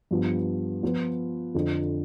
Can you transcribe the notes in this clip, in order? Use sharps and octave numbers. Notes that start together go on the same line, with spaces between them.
G2 F3 B3
F3 B3 F4 B4
F2 D3 F3